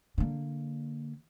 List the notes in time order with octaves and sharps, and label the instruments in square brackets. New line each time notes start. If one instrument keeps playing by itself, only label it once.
[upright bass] D3 A#3